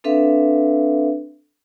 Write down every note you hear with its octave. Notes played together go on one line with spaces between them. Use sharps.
C4 D4 A4 B4 E5 F5